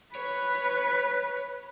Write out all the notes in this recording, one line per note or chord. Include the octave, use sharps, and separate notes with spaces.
B4 C#5